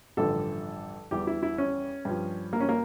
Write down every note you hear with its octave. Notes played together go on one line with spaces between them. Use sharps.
A1 G2 D3 F3 A4
E2 E3 G3 G4
E4
E4
C#4
G2 F3
A#3
C#4
A#3